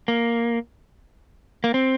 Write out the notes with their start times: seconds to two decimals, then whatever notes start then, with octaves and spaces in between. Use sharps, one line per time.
0.08 A#3
1.64 A#3
1.74 C4